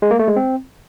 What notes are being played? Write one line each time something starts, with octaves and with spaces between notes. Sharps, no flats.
G#3
A#3
A3
G#3
C4